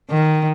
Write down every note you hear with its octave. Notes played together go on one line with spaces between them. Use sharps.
D#3